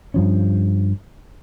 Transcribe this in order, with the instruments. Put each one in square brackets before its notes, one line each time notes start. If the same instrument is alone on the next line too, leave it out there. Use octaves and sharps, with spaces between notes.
[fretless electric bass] G2 F3 C#4